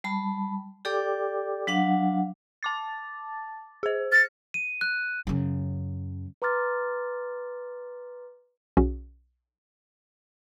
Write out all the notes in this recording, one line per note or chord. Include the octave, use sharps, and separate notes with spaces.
G3 A5 B5
G4 A4 D5 G5 D6
F#3 D4 F5 F#5
A5 D6 A6
G#4 C5
F6 A6 A#6 C#7
D#7
F#6
F#2 C#3
B4 A#5 C6 D6 F6 A6
B1 C#4 F#4 G#4